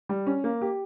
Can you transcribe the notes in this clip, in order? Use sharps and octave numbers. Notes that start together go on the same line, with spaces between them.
G3
C#4
A#3
G4